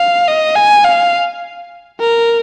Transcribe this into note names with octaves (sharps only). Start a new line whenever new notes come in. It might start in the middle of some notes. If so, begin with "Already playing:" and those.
Already playing: F5
D#5
G#5
F5
A#4